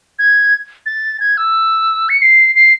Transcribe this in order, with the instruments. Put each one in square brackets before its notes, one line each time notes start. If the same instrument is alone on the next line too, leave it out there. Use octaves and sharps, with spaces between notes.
[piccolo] G#6
A6
G#6
E6
C#7
C7
C7